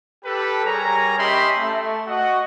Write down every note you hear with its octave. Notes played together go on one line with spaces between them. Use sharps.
G4 A4 B4
G3 G#4 A#4 C#5 A#5
C#4 G4 D#5 E5 B5 C6
A3
F#4 D#5 F#5